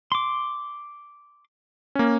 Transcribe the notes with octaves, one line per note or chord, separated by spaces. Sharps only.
C6 D6
A#3 C#4